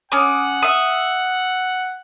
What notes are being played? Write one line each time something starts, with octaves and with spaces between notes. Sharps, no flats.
C#4 F#5 D6 D#6
E5 D#6